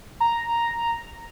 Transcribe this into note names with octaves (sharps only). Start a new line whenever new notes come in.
A#5